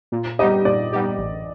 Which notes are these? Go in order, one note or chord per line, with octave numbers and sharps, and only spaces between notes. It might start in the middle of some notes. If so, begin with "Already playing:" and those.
A#2
G3 B3 D#4 G4 D#5
A#2 D5
G3 B3 D#4 G4
A1